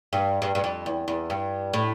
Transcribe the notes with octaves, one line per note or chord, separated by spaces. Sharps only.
G2
G2
G2
F2
E2
E2
G2
A2